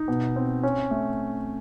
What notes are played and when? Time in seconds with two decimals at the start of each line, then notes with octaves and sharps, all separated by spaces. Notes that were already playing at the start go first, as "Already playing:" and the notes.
Already playing: D#4
0.08 B2
0.36 C4
0.63 C#4
0.91 A3